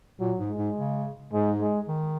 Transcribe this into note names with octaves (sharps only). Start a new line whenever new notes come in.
A#2 F#3
G#2
G#3
G#2
C#3
G#2 G#3
G#3
D#3